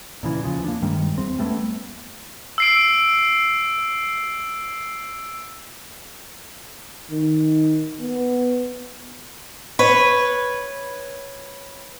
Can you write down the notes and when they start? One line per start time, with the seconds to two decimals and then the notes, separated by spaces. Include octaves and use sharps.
0.23 A#2 C#3 E3
0.44 E2 C#3 F3
0.64 A#3 D4
0.82 G2 D#3 G3 G#3
1.18 E2 C4
1.39 G3 A3 B3 C#4
2.58 E6 C7 D7
7.10 D#3
8.00 B3
9.79 B4 C#5